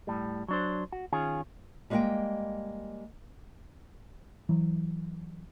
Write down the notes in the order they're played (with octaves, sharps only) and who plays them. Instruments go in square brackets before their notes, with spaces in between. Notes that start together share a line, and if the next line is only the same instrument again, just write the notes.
[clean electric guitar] A2 G3
F#3 D4 C5
F#4
D#3 C#4 F4 G#4
[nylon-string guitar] G3 G#3 A#3 A#4 D#5 G5
[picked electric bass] E3 F#3